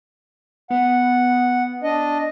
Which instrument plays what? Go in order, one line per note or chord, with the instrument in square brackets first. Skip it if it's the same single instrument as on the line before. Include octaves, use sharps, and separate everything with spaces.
[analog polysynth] B3 [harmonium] F#5
[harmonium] D4 D#5